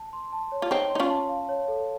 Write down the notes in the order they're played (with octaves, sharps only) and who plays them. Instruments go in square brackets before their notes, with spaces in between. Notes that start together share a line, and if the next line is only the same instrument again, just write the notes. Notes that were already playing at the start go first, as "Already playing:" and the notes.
Already playing: [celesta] A5
C6
A5
C#5
[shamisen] F4
[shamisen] C4 D#4 [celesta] C#5
[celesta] C6
[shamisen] D#4
C#4 F4
[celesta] A5
F5
C#5
A4